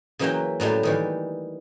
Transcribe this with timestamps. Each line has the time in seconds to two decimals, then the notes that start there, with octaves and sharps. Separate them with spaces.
0.19 C#3 E3 F#3 A#3 E5 G5
0.60 A2 F#3 G3 A3
0.83 D#3 E3 G3